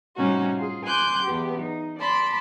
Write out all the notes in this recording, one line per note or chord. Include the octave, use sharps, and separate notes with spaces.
A2 C3 G3 C#4 D#4 F#4
F4 G#4
G#5 C6 D6 F#6 G6
E2 B3 G4
D#4
D5 A5 B5 C6